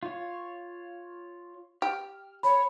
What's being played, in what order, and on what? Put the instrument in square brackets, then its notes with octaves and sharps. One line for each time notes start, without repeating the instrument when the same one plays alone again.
[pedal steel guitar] F4 C#5
[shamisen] G4 [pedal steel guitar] F6
[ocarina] C#5 [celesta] B5